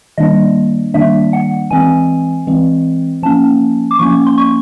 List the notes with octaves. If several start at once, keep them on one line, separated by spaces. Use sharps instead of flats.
D#3 G3 A#3 D4 D#5
D#3 G3 A#3 D4 E5
F#5
E3 G#3 C4 G#5
E3 G#3 C4
F3 A#3 C#4 A5
D6
F3 A#3 C#4 C#6
C6
C#6